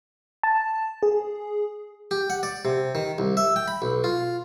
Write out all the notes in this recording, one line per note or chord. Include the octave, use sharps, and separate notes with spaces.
A5
G#4
G4
F#5
D5
C3
D#3
C2
E5
G5
B5
B1
F4